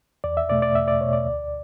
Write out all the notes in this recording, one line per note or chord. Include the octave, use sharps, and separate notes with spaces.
E2 D5
E5
B2 A3 D5
D5
E2 E5
D5
B2 A3 C#5
D5
D2